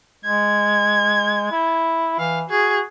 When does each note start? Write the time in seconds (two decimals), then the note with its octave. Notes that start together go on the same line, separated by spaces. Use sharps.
0.25 G#3 G#6
1.52 E4
2.19 E3 F5
2.49 F#4 G#4